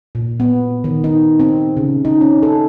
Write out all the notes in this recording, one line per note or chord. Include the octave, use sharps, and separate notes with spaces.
A#2
B3
D#3
D#4
C4
C#3
D#4
C#4
A4